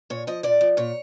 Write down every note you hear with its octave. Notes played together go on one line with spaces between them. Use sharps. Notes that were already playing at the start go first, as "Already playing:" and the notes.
A#2 C#5
F3 D#5
A#2 D5
F3
A#2 C#5